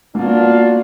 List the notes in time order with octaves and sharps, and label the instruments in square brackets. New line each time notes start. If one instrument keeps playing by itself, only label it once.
[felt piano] A#3 B3 [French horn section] D4 F4 F#4